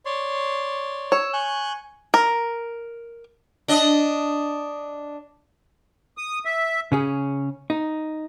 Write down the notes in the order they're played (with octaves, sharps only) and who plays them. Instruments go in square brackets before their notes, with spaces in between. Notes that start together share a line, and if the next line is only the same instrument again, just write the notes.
[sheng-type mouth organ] C#5 D5 C6
[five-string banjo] C#5 [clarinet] E6
[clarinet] G#5 [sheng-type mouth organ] C#6 F#6 G6
[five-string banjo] A#4
[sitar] D4 D#5
[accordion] D#6
E5
[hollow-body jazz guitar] C#3 C#4 G#4
D#4